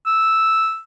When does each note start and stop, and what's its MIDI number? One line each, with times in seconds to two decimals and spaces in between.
0.06 0.80 88